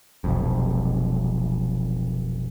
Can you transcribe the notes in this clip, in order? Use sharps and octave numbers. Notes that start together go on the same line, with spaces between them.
F1 B1 F2